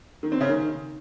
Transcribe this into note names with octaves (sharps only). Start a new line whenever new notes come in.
D#3
C4
C#3
D#3